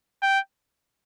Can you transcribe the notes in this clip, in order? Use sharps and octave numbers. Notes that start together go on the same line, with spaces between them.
G5